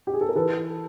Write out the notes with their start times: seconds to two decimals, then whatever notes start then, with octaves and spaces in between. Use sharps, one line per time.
0.07 G4
0.14 G#4
0.21 A4
0.29 A#4
0.35 E3 A4 B4